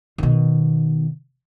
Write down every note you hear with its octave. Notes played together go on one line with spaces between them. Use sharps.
B2 D#3